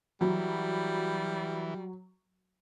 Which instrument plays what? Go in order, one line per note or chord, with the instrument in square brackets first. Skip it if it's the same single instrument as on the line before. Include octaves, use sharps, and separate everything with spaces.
[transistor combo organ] E3 [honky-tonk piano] F#3 [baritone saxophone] G3